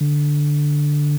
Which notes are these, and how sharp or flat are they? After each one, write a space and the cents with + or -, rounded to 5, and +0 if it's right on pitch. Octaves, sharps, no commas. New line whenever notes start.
D3 +0